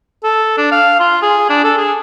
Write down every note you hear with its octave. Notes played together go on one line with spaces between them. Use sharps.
A4
D4
F5
F4
G#4
D4
A4
G#4